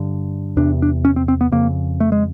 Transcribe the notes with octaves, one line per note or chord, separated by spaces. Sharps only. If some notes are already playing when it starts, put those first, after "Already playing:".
Already playing: G2 D3
E2 C3 D4
D4
C#4
C4
C4
B3
F2 C#3 A#3
A3
G#3